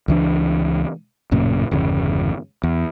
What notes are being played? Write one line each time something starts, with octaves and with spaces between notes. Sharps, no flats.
C#2 E3 D4
A1 F#2 A#2 C#3
G1 E2 C#3
E2